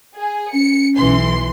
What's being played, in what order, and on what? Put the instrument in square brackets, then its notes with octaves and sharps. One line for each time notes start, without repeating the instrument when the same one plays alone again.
[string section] G#4
[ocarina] C#4 [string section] C#7
[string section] B1 E3 C6